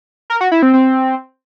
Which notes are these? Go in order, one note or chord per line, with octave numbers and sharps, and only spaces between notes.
A#4
F#4
E4
C4
C4